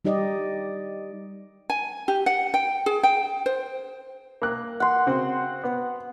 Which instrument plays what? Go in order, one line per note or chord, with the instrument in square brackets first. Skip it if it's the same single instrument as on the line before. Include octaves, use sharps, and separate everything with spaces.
[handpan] G3 D#4 G4 D5 D#5
[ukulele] G#5
G4
F#5
G5
G#4
G5
C5
[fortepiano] A#3 F#6
[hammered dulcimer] F#5 C6
[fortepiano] C#3 C4 F#4
B3